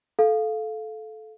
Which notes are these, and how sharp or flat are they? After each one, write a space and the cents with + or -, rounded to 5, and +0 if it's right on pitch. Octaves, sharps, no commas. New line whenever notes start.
A4 -15 F5 +0